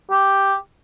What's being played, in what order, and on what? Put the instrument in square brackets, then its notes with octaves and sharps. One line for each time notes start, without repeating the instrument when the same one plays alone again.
[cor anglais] G4